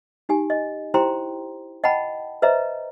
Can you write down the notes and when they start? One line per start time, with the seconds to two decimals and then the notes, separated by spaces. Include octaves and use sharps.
0.29 D#4 G4 G#5
0.50 D#5
0.94 E4 G4 C5 G5 A#5 C6
1.84 D#5 F#5 G5 A5 B5
2.42 B4 C5 D#5 E5 A#5